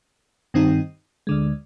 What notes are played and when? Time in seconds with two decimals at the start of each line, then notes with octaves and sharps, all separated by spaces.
0.54 G2 D#3 G3 C4 D#4
1.27 D2 D3 G#3